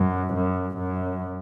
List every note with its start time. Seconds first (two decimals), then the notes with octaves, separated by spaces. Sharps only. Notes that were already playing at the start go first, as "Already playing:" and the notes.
Already playing: F#2
0.34 F#2
0.78 F#2